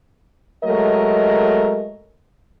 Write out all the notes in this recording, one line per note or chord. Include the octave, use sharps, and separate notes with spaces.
F#3 G#3 A3 A#4 D#5